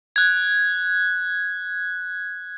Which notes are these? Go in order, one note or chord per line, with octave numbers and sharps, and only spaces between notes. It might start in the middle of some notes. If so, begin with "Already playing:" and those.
F#6 G#6